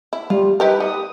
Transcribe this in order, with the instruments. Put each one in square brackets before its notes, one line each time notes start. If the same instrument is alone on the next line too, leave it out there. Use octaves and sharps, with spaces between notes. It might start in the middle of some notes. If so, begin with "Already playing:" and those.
[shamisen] E4
[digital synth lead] G3 [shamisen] F4
[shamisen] D#4 G4 A#4 [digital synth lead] B4
[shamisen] G3 [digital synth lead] D#6